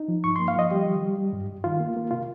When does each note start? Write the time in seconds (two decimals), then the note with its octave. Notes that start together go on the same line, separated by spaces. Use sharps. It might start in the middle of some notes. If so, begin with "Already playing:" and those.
Already playing: D#4
0.08 F3
0.24 G2 C#6
0.36 A#3 C6
0.48 F5
0.56 F3 D#5
0.71 G3 G4
0.86 D#3
1.02 G3
1.18 G3
1.33 G2
1.49 G2
1.64 D#3 F4
1.80 A#3
1.96 A#3
2.11 C3 F4